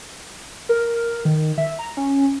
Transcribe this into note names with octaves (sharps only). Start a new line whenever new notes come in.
A#4
D#3
E5
A#5
C#4